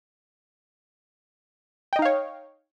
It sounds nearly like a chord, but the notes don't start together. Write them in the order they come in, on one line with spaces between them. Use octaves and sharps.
G5 D#5 D#4 F5 C#5